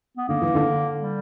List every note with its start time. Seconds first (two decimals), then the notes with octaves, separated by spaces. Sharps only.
0.17 B3
0.28 D3 A#3
0.42 E3
0.55 D3
0.99 G3